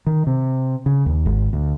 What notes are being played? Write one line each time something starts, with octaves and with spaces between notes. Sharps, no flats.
D#3
C3
C#3
D#2
G#1
D2